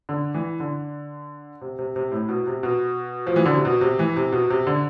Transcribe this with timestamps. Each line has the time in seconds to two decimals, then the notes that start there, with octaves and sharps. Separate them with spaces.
0.09 D3
0.34 E3
0.60 D3
1.61 C3
1.79 C3
1.96 C3
2.12 A2
2.29 B2
2.47 C3
2.63 B2
3.27 F3
3.36 E3
3.45 D3
3.55 C3
3.65 B2
3.81 C3
3.99 E3
4.16 C3
4.32 B2
4.50 C3
4.67 D3